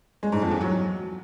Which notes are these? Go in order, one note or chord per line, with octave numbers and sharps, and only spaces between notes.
G#3
G#2
F2
E2
F#3